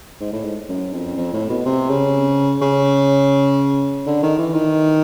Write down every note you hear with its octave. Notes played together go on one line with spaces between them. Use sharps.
G#2
A2
G#2
F#2
F2
F2
A2
B2
C3
C#3
C#3
D3
D#3
E3
D#3